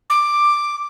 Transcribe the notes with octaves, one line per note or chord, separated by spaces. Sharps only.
D6